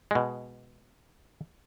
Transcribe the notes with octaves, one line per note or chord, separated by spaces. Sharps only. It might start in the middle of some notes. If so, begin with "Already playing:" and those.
B2 G#3